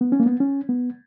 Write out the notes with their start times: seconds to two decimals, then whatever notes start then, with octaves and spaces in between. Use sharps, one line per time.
0.01 B3
0.12 C#4
0.20 A#3
0.26 B3
0.40 C#4
0.69 B3